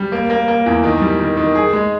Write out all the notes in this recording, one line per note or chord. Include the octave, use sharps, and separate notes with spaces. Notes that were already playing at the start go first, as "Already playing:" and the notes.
Already playing: G3
A#3
A#3
A#3
E2
D#3
G3
D#3
D#3
G#4
G#3